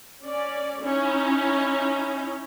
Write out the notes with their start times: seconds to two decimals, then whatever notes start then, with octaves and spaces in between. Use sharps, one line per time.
0.22 C#4 D5
0.81 C#4 D#4 E4